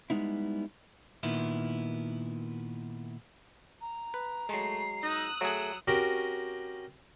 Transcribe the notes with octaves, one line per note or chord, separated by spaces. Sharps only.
G3 G#3 B3 D#4 E4
A#2 D#3 B3 E4
A#5
B4
F#3 G#3 A3 C7
D#4 D#6 E6 F#6
F#3 A3 G#4
C4 C#4 F#4 G4 A#4